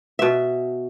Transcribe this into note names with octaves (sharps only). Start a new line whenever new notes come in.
B2 E5